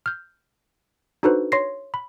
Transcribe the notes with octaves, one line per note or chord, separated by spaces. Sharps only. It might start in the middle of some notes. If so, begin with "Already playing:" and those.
F6 G6
D4 D#4 F#4 A4 B4 C5
C#5 C6 A#6 C7
B5